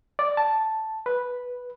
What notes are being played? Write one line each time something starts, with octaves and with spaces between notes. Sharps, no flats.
D5
A5
B4